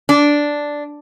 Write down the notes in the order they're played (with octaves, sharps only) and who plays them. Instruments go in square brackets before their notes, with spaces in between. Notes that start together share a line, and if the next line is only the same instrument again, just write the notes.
[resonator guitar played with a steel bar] D4